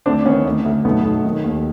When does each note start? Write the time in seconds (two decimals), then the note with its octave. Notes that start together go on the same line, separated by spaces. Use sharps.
0.06 D2 C4 D4
0.26 D#3 B3 C#4
0.46 D2
0.66 D2
0.84 B1 A3 B3
1.05 B1
1.24 D#3
1.44 D#2